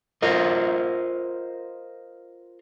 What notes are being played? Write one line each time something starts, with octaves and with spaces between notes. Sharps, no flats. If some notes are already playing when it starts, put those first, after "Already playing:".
F4 A#4 C5 D#5